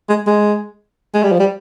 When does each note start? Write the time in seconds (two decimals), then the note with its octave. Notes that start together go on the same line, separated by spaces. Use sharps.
0.09 G#3
0.27 G#3
1.14 G#3
1.23 G3
1.32 F3
1.40 G3